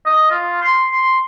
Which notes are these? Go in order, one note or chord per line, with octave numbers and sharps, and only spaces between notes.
D#5
F4
C6
C6